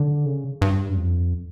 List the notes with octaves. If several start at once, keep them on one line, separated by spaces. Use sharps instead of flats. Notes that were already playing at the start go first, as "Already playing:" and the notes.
Already playing: D3
C#3
G2
F#2
F2